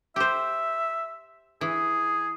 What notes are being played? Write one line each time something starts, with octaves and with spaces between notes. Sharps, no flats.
G4 C5 E5
E3 G#4